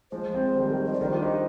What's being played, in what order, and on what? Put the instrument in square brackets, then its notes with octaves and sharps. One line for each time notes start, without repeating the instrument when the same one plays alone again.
[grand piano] F3 G#3 [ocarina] C5
[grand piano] G#3 C4
D#3 G3
D#3 G3
[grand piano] F3 [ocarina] D#5
[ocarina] D5
[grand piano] D#3 G3 [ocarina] C5
[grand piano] D4 F4
D#4 G4